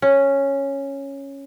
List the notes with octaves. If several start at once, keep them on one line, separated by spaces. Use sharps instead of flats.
C#4